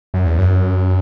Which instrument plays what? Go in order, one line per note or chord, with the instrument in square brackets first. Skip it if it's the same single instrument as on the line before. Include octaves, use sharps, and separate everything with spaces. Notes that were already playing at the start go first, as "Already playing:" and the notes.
[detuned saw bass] F#2
E2
F#2